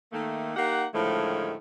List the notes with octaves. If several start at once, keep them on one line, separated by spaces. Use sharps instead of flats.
D#3 A3 A#3
A#3 D#4 G4 F#5
A2 D3 D#3 F3 G#3 A3